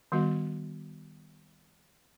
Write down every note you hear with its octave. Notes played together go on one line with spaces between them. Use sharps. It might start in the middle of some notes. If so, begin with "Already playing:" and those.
D#3 G3 B3 F#4 D#5